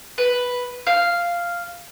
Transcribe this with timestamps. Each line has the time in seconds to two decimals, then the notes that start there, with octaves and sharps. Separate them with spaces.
0.18 B4
0.87 F5